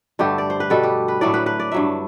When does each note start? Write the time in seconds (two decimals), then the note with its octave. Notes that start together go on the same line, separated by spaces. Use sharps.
0.19 G2 D3 A3 G4
0.38 D5
0.50 C5
0.60 B4
0.70 B2 G3 A4
0.83 G4
1.08 B4
1.21 A2 F#3 A3 D5
1.34 B4
1.46 B4
1.60 D5
1.72 G2 F#3 A3 E5